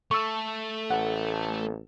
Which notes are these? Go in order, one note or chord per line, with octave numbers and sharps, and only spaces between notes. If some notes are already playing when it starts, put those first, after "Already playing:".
A3 A4 C#6 E6
A1 F#5